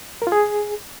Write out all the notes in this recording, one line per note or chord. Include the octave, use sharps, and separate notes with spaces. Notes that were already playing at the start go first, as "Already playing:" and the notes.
A#4
F4
G#4